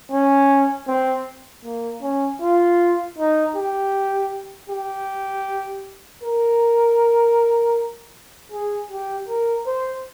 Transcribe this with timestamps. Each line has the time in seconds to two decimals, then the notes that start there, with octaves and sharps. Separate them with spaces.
0.12 C#4
0.88 C4
1.64 A#3
2.03 C#4
2.42 F4
3.18 D#4
3.56 G4
4.70 G4
6.23 A#4
8.52 G#4
8.91 G4
9.28 A#4
9.67 C5